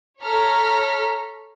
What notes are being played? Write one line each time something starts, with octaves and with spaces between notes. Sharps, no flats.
A4 C#5 A#5 F6 B6